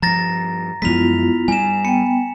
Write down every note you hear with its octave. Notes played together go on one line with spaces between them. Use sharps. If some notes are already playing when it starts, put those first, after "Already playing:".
G2 F3 A#5 A6 A#6
F#2 F3 G#3 B3 E4 F4 B6 F7
G2 G3 G#5 E7
B3 G5 C#7